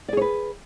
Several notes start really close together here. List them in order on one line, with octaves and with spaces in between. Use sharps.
D5 G#4 C#5 B4